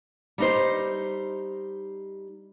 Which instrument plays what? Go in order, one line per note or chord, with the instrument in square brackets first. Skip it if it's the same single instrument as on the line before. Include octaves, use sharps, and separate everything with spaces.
[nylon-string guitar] G3 D#4 C5